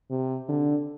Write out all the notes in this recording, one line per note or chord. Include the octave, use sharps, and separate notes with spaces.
C3
D3